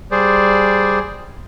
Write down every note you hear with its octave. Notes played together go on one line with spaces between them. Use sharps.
G3 G#4 C5 D5